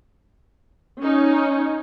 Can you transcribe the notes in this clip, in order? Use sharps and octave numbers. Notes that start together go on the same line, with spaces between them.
C#4 D#4